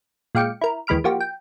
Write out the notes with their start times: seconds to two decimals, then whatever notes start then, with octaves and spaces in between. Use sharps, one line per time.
0.35 A#2 G#3 F5 G5 D6 C#7
0.61 E4 A#4
0.87 D#2 E3 G#3 B5 F6 D7
1.04 F3 A#3 F#4 G4
1.21 G5